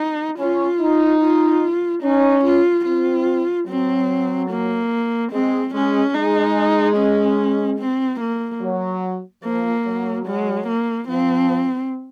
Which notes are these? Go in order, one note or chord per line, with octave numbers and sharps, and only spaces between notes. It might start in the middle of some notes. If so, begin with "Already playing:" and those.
Already playing: D#4
C#4 F4
D#4
F4
C#4 D#4
F4
C4 F4
F#3 C4
A#3
G#3 C4
G#3 C#4
G#3 D#4
C#4
C4
A#3
F#3
F3 A#3
F#3
G#3
A#3
F3 C4